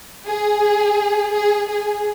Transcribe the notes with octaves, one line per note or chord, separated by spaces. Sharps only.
G#4
G#4
G#4